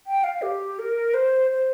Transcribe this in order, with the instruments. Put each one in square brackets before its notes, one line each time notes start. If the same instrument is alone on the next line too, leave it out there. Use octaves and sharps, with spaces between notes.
[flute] G5
F5
G4
A#4
C5
C5